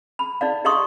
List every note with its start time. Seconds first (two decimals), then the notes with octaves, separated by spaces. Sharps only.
0.19 B5
0.41 D#4 D5 F5
0.65 G4 D#5 F5 C6 C#6 D#6